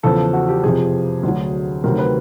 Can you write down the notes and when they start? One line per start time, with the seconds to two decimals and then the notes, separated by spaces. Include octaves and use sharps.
0.03 E2 C#3 F3 A4
0.33 F#4
0.48 G4
0.64 F2 C3 F3 G#4
1.23 D2 D3 F#3
1.84 D2 C3 D#3 F#3 A#4
1.98 B4